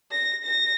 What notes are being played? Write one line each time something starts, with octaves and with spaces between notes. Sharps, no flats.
A#6
A#6